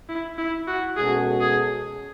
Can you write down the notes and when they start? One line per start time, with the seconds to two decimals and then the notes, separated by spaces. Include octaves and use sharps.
0.09 E4
0.38 E4
0.67 F#4
0.96 B2 G#3 C#4 F#4 G#4 A4
1.40 G#4